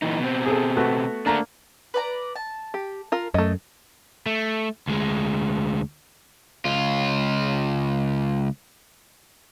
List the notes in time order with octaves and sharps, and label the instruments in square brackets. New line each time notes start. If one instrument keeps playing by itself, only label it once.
[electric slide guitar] A#2 E3 D#4
B2 C4
[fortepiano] G#4 A4
A3 B3 F#4
[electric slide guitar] A3 D4 [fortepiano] A#3 A#5
[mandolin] B4 D5 A#5
A5
[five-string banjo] G4
F4 A#4
[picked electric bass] F#2 [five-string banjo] A3 D#5
[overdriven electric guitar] A3
D2 G#3
C#2 F4